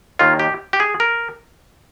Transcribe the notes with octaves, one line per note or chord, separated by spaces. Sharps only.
D#2 D#3 A#3 F4
G4
G4
G#4
A#4